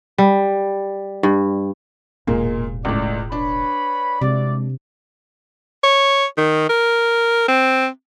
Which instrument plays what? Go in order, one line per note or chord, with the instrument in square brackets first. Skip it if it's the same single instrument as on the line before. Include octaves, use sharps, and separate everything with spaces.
[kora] G3
G2
[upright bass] E1 A1 [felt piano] A#2 G#3 A#3
[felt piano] C#2 A2 [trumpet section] D5
[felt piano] D4 [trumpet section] B4 C#5 B5
[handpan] C3 [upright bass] G#3 [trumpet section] E4 F#4 D5
[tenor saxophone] C#5
D#3
A#4
C4